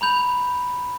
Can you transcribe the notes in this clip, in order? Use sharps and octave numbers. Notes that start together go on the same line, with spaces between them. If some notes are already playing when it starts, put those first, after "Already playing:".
A#5 B5 G6 F7